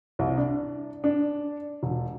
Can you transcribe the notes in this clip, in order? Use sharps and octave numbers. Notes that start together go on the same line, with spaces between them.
C2
D4
D4
E1